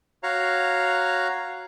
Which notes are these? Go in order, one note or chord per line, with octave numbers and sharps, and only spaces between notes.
F#4 C#5 F5 A#5